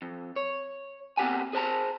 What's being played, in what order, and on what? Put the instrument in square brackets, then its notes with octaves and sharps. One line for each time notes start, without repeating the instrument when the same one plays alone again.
[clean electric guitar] F2
C#5
B3 C4 G4 F#5 G#5
G#4 C5 A5 A#5